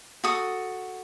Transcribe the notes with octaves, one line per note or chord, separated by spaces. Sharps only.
F#4 A4 D#6